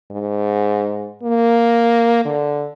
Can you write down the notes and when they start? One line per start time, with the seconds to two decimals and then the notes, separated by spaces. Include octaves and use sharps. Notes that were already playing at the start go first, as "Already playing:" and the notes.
0.11 G#2
1.23 A#3
2.25 D3